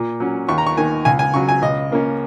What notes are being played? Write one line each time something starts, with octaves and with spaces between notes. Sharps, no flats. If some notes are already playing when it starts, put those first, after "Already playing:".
Already playing: A#2
F#3 C#4
D#2 C#6
A#5
C#6
D#3 A#3 G#5
C#2 G#5
G#5
C#3 F#3 C#6
G#5
C#2 D#5
C#3 A#3 C#4